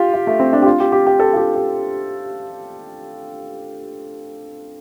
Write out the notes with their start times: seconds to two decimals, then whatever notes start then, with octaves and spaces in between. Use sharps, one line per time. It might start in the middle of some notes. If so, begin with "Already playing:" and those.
Already playing: F4 G4
0.14 F4
0.27 A3
0.40 C4
0.53 D4
0.62 G4
0.66 F4
0.80 G4
0.92 G4
1.07 G4
1.19 A4
1.33 F4
1.37 G4
1.55 G4